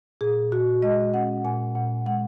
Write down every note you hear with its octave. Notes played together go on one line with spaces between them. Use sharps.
A#2 G#4
A#2 F#4
G#3 D#5
C#4 F#5
A#2 G#5
A#2 F#5
G#3 F#5